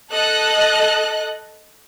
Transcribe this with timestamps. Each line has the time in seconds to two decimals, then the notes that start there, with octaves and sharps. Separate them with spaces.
0.11 A4 D#5 F#6